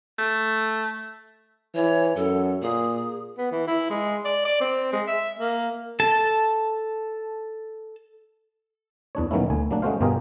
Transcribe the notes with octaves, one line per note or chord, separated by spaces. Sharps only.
A3
E3 C#5
F#2 A4
A#2 G#4
B3
E3
E4
G#3
D5
D5
C4
G#3
E5
A#3
A4 A5
E2 D4 C#5
B2 D#3 F#3 A#3 C#4 E4
D2 G#5
F#3 A#3 D4
G#3 A3 C#4 F#4 C5 F5
G1 B2 F4 G4 G#4 A#4